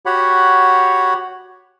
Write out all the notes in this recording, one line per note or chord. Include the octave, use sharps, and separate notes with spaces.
F#4 G4 C#5 F#5 B5